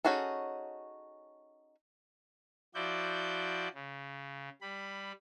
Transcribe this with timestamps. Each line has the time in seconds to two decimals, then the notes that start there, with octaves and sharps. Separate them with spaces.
0.05 C#4 D#4 F#4 G#4 A4
2.75 F3 E4 F#4 D5 G6
3.74 C#3
4.61 G3 B5